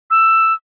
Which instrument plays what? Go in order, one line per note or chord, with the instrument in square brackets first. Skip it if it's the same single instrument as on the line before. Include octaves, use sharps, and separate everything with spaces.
[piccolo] E6